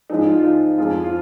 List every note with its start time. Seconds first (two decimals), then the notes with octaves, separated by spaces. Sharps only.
0.10 G#2 F3 G#3 D#4
0.27 F4
0.39 F4
0.44 D#4
0.78 F2 F3 G#3 F4
1.04 F4